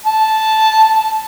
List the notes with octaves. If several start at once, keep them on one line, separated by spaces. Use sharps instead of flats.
A5